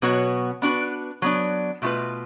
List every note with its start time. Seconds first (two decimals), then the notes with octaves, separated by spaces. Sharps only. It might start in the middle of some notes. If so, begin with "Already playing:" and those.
0.02 B2 F#3 B3 F#4 C#5
0.62 B3 D4 F#4 B4
1.22 F#3 B3 D4
1.82 B2 A3 F4 B4